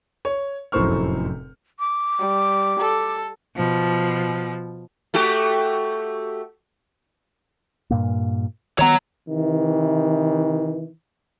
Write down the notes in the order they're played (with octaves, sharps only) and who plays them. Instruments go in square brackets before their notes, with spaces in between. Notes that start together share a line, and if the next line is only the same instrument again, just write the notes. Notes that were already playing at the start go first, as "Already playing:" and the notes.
[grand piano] C#5
F1 F#2 A2 C5 C#6 F6
[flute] D6
[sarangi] G3
A4
[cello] B2 F3
[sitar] A3 F#4 G4
[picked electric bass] G2 A#2 A#3
[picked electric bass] D#3 B3 [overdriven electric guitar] C#5 A#5
[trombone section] C3 D#3 E3